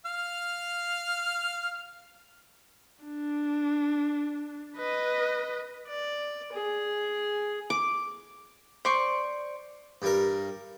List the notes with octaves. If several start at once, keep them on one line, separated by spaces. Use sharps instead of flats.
F5 F6
D4
B4 D#5
D5
G#4
D6
C5 D5 C#6
G2 G3 A#4